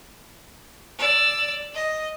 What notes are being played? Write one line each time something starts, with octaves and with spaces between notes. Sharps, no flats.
D5 E6
D#5